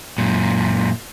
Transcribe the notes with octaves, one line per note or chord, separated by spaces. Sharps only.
F#2 A#2